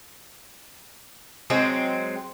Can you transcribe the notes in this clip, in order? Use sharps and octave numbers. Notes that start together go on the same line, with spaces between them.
F#3 G#3 C4